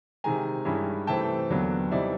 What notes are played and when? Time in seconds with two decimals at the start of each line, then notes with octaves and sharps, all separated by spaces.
0.24 C3 D#3 G#3 G#5 A#5
0.65 G2 D#3 G#3 C#4 E4
1.07 C3 E3 A3 C4 G5 A5
1.50 D#2 D3 F#3 B3 D4
1.91 C3 E3 G3 C4 D#4 D5 E5